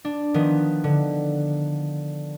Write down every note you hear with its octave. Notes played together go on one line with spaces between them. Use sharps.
D4
D#3 F3 B3
D3